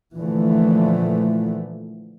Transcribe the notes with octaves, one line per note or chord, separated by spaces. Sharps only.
A#2 D3 E3 F3 A3